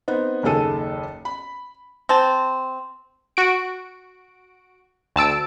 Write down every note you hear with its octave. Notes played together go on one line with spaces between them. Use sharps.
B3 C4 D#4
F#1 D#2 D#3 G#4 A4 D#7
B5
C4 A5
F#4 D7
D2 A5 E6 D7